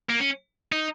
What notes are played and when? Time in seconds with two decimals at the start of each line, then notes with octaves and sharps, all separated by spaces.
0.10 A#3
0.20 C#4
0.72 D#4